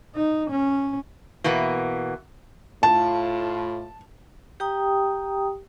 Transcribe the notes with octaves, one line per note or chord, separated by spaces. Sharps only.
D#4
C#4
B2 E3 A#3 B3
A2 F4 A5
G4 G5 A#5 D#6